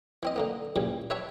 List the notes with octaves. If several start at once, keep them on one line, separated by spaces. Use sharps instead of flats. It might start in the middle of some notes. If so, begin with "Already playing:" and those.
E3 C4 D#5
D3 A#3 B3
A#2 C#3 E3 F3 G3
B4 C#5 E5 G5 A5 C#6